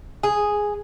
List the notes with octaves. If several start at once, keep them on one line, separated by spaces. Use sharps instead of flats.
G#4